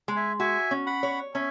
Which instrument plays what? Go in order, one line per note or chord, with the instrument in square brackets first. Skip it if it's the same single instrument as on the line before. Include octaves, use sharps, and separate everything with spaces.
[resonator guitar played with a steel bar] G#3
[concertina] E5 G#5
[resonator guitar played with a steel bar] F#4 [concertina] E5 G#5
[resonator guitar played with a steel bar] C#4
[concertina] F#5 B5
[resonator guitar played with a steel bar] C#5
[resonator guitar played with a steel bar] C#4 [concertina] E5 G#5